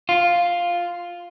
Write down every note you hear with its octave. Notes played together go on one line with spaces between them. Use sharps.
F4